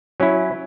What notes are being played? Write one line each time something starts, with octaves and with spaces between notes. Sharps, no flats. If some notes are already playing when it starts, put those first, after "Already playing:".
F#3 C#4 E4